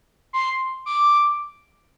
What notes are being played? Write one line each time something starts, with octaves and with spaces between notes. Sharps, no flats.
C6
D6